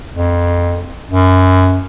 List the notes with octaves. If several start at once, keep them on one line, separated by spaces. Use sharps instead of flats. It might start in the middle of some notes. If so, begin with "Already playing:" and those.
F2
F#2